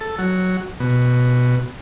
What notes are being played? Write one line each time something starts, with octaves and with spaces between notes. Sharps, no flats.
A4
F#3
B2